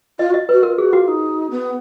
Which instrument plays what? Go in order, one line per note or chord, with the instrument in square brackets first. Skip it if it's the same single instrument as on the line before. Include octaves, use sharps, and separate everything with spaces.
[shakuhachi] F4 [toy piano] D#5
[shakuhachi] F#4 [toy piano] D#5
[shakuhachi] F#4 [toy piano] B4
[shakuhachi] F4 [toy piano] A#4
[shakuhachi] F#4 [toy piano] G#4
[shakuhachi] F4 [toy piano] F#4
[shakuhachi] D#4
B3